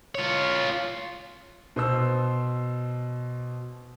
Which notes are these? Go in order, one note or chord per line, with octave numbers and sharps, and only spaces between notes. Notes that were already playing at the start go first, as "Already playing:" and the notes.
F4 C#5
B2 C5 E6